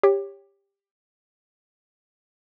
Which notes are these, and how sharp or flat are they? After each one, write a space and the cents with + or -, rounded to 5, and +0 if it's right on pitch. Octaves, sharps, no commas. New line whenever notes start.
G4 +15 C#5 +0